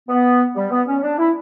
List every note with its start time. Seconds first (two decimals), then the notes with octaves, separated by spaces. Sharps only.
0.09 B3
0.56 G3
0.71 B3
0.88 C#4
1.03 D4
1.19 E4